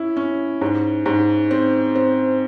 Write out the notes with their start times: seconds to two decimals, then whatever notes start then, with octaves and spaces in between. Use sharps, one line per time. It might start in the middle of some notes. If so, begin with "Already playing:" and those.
Already playing: C#4 E4
0.17 C#4
0.61 G#2
1.06 G#2
1.51 C4
1.95 C4